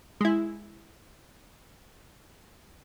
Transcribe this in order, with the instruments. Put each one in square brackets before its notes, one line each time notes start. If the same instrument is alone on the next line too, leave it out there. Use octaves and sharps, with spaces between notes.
[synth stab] G#3 E4